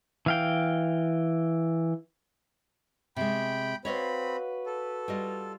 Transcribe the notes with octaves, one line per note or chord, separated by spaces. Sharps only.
E3 F5 G5
C3 G#3 G5 B5
C4 F#4 B4 C#5 D#5 F5 B5
A4
G3 F4 D#5